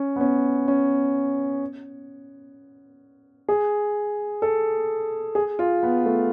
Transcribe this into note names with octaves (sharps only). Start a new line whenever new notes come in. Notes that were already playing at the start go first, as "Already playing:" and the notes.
Already playing: C#4
B3
C#4
C#4
G#4
A4
G#4
F4
B3
A3